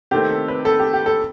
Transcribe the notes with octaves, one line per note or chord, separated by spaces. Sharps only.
C3 D#3 A3 C4 G4
A4
B4
A4
G4
G4
A4